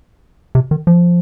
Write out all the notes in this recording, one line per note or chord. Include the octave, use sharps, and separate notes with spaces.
C3
D#3
F3